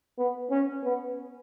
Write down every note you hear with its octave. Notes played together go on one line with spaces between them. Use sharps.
B3
C#4
B3